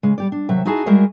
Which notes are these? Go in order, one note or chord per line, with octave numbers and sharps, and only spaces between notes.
C#3 G#3
G3 G4 D5
D4
D#2 C3 F#3 E5
D#4 E4 F#4 G#4 G#5 A5
G3 G#3 F#4 G#4 A#4 E5